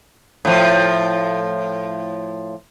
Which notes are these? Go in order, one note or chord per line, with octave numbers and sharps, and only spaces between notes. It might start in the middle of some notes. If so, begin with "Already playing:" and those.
A2 F3